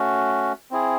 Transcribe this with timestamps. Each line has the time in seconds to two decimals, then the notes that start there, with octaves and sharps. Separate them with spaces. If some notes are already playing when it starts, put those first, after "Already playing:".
Already playing: A3 C#4 F#4
0.71 C4 E4 G#4